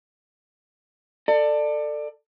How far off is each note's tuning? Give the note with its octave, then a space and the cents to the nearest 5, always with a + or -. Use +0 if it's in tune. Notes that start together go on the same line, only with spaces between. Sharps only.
A4 +20 D5 +20